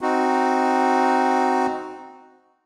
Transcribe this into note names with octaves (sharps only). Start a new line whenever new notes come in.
C4 D#4 F#4